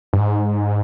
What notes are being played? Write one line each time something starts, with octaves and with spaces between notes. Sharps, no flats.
G2
G#2